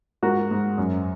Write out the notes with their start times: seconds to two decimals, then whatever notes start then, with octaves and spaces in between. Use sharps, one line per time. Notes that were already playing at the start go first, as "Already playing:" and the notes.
0.22 G#2 F#4 A#4
0.51 G#2
0.78 F#2